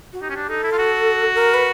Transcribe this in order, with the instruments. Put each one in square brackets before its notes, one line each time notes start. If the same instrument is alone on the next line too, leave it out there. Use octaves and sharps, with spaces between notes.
[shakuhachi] F#4
[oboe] D#4 [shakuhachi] G4
[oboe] C#4
D4
[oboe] D#4 [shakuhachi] A4
[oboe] E4
F4
F#4
[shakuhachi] A#4
B4